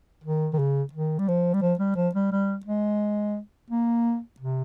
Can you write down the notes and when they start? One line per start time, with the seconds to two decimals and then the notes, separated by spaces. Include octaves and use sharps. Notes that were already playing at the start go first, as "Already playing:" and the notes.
0.24 D#3
0.53 D#3
0.58 C#3
0.93 D#3
1.19 G3
1.28 F3
1.54 G3
1.62 F3
1.79 G3
1.96 F3
2.15 G3
2.32 G3
2.66 G#3
3.71 A#3
4.40 C3